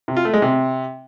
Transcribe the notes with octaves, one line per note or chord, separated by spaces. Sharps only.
C3
F4
A3
G#3
C3